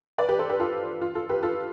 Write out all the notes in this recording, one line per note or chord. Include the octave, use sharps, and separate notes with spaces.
B4 D5
G4 B4
A4 C5
G4 B4
F4 A4
F4
F4 A4
G4 B4
F4 A4